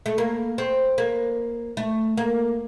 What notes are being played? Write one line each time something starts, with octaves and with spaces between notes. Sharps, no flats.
A3
A#3
C4
A#3
A3
A#3